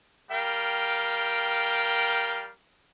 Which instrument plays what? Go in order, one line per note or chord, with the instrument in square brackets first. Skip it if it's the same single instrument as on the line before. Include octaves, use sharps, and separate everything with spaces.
[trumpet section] G3 A#4 F5 G5